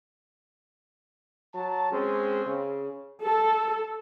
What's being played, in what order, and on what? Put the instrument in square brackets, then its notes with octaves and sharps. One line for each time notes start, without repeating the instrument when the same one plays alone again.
[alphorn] F#3 [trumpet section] A5
[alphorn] G#3 [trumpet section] C4 C#4 C5
[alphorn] C#3
[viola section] A4